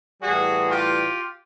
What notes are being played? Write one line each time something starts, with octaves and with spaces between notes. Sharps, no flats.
A2 E3 G3 F#4 G#4
F4 G4